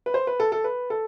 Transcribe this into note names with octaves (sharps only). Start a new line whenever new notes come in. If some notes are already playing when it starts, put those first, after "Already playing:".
B4
C5
B4
A4
A4
B4
A4